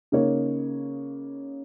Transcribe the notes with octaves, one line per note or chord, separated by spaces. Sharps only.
C#3 A#3 D#4 C#5